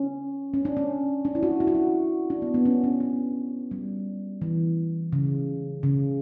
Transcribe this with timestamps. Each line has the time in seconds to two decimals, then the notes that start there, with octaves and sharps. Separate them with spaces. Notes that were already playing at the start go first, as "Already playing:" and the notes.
Already playing: C#4
0.54 C#4
0.65 D4
0.77 C#4
1.25 D4
1.35 E4
1.43 F#4
1.60 E4
1.67 F#4
1.75 E4
2.30 D4
2.42 B3
2.54 B3
2.66 C#4
2.84 C#4
3.00 B3
3.71 G3
4.42 E3
5.13 C#3
5.83 C#3